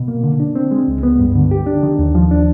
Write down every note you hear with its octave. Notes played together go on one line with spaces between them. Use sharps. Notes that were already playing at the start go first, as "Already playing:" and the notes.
Already playing: B2
A#3
D3
D4
C4
G#3
C#2
B3
G2
D3
G4
D4
D#3
D#2
F3
D4